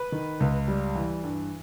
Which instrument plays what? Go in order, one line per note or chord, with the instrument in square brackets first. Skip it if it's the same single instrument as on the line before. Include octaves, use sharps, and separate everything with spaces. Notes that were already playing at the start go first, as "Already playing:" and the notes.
Already playing: [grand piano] B4
D#3
C#2
G3
E3
G2